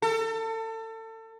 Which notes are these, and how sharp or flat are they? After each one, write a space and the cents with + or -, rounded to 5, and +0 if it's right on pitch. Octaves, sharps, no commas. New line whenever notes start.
A4 +30